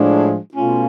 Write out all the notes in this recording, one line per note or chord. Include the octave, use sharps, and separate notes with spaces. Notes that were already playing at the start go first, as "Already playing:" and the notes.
Already playing: A2 F3 G#3 D4
B2 A3 C#4 F4